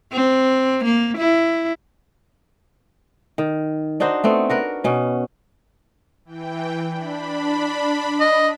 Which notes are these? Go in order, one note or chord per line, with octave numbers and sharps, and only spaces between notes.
C4
A#3
E4
D#3
D4 D#4 F#4 C5
A3 B3 C4
F#4 A#4 B4
B2 C#4
E3 G5
D4 B5
D#5